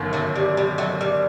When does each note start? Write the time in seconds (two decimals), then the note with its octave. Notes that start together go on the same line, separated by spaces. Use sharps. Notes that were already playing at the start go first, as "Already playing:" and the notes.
Already playing: G1 F#2 D#3
0.13 F#3 A3
0.36 G3
0.57 G3
0.78 F#3 A3
1.01 G3